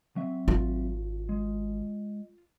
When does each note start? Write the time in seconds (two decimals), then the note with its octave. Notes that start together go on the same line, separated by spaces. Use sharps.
0.16 F#3 C4 E5
0.48 G#1 F4
1.29 G#3